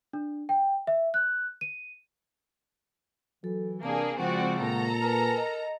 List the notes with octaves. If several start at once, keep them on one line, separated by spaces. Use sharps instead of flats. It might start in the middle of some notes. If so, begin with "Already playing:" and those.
D4
G5
E5
F#6
D#7
E3 F#3 A4
C3 A#3 D4 G#4 D5 A5
C#3 F3 G#3 C4 F#4 D5 F#5 C#6
A#2 A4 A#5
A#4 B4 G#5 A5
D#5